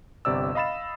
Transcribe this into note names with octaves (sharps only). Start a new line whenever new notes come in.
G1 C3 D5 E6
D#5 F5 B5 A6 E7